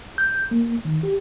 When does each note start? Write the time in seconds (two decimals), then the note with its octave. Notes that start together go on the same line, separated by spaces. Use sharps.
0.18 G6
0.51 A#3
0.85 D#3
1.03 G4